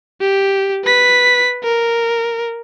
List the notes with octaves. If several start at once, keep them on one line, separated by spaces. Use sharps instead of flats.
G4
B4 B6
A#4